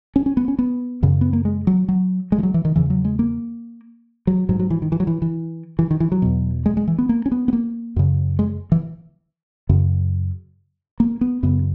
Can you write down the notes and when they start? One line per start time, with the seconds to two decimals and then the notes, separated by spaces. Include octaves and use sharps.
0.16 C#4
0.26 C#4
0.37 B3
0.48 C#4
0.59 B3
1.03 F#2 C#3
1.21 B3
1.33 A#3
1.45 G#3
1.67 F#3
1.89 F#3
2.32 G#3
2.38 E3
2.43 F#3
2.54 E3
2.65 D#3
2.76 E2 C#3 E3
2.90 F#3
3.05 G#3
3.19 A#3
4.27 F#3
4.49 G#2 F#3
4.59 F#3
4.70 E3
4.82 D#3
4.92 E3
5.00 F#3
5.07 E3
5.22 E3
5.79 E3
5.91 D#3
6.00 E3
6.12 F#3
6.22 E2 B2
6.66 G#3
6.77 G#3
6.88 E3
6.98 B3
7.09 A#3
7.26 C#4
7.32 B3
7.48 B3
7.53 A#3
7.96 F#2 C#3
8.39 G#3
8.72 E3
9.69 F#2 C#3
11.00 A#3
11.21 B3
11.43 F#2 C#3 B3